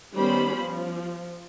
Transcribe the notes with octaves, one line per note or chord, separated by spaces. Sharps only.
D#3 G3 B3 C#4 C5 B5
F3